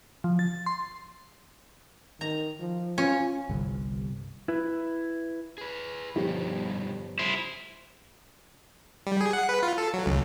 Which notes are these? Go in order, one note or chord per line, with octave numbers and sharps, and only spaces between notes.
F3
A6
C6
D#3 A#5
F3
C#4 F4
G1 C2
E4 B4
G#4 B4
G1 G2 B2 D#3 F3 G4
E4 C5
G3
G#4
F#5
B4
F4
A4
F#3
C#2